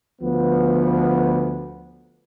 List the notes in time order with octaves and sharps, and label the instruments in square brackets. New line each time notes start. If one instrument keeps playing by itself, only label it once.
[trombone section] D2 F3 B3